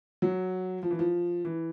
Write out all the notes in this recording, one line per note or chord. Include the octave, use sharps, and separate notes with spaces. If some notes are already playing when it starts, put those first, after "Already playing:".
F#3
F3
E3
F3
E3